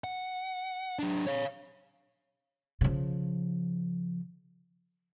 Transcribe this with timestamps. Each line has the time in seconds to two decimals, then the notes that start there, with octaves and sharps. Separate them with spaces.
0.04 F#5
0.99 F#3 D4
1.27 C#5 F5
2.81 C#3 F3